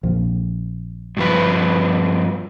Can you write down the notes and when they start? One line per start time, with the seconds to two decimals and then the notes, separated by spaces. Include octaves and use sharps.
0.03 A#1 F2
1.17 G2 F3 B4